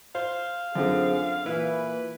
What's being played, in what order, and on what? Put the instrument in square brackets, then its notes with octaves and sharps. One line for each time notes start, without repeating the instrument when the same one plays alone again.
[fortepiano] C5 [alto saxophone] F5
[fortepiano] F#2 D3 [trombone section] C4 F4 G#4
[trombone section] A#2 E3 [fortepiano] E4 [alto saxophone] B4